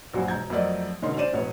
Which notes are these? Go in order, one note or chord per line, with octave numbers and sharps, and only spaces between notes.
A#1 G2 F#3 F#4 C5 G#5
E1 A#5 G6 G#6
F2 F#3 A3 A#4 D5 D#5
E1 D3 C#4 D#4 A#4 C6
C#4 C5 D5 D#7 E7
E1 A1 B3 C#5